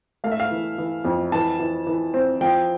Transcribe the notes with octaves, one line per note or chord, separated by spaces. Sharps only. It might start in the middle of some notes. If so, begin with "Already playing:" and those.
A3 F5
E5
F5
E3
E3
F2
E3 A5
E3
E3
C4
F3 G5